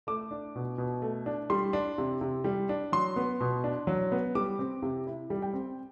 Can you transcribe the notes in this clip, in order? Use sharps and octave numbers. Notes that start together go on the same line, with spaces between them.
A3 D6
D4
B2
B2
A3
D4
G3 C6
D4
C3
C3
G3
D4
F#3 C6
B3
B2
D4
F#3
B3
G3 D6
C4
C3
E4
G3
G5
C4